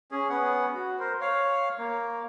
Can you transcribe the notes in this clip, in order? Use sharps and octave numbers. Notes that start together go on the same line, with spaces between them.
C#4 G#4
B3 C#4 F#5
F#4
A#4 C5
C#5 F5
A#3